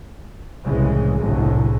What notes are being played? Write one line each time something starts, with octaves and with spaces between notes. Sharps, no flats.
C2 A2 C#3 E3 G#3
G1 C2 A2 D3 F#3 G#3